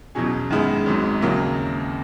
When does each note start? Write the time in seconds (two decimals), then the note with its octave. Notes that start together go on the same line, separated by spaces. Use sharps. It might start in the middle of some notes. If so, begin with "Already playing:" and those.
0.15 E2 B2 F#3 C#4 G#4
0.50 F#2 D#3 G#3 B3
0.86 G#1 G#2 F#3
1.21 D#2 C#3 F#3 A#3 E4